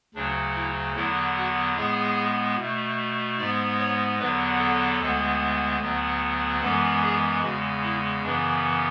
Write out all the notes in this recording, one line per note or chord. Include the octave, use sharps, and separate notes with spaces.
D2 C#3 F#3 D4
E4
E2 D3 F#3 B3 E4
F#4
A2 G#3 B3 G#4
B2 A3
G#2 G#3 B3 D5
C#5
E2 D3 F#3 B3 B4
A4
D2 D3 G#3 B3
D2 D3 F#3 B3
F#2 E3 G#3 B3 A4
G#4
E2 C#3 G#3 F#4
E4
F#2 C#3 E3 B3 D4